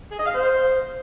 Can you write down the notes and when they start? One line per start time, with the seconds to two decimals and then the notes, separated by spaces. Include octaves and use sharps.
0.10 G#4
0.18 D#5
0.26 F5
0.34 C5